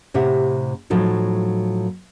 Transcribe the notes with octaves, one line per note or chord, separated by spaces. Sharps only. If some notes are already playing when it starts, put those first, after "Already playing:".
A2 C3 G4 E5 F#5
A2 F3 F#3 D#4